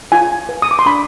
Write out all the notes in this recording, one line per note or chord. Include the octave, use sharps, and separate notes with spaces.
F4 G#5
B4
D#6
D6
C6
D4 B5